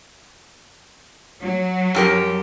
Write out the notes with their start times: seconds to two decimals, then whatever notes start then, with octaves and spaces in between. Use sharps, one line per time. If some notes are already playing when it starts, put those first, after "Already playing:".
1.41 F#3
1.95 F#2 G4 A#4